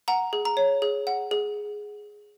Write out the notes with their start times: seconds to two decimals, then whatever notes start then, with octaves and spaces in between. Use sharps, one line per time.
0.08 F#5 A#5
0.33 G#4
0.45 A#5
0.57 C#5
0.82 G#4
1.07 F#5
1.31 G#4